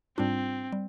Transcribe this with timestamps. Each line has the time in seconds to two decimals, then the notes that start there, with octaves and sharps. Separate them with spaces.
0.17 G#2 G3 C4 D4 F4
0.72 G3